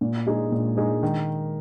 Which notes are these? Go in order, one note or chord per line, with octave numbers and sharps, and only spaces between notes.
A#2
G#3 D#4 G#4
A#2
G#3 D#4 G#4
D#3